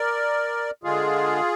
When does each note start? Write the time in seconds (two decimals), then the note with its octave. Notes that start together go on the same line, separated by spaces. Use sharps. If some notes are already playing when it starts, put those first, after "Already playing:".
Already playing: A#4 D5
0.84 D3 G#3 F4 G#4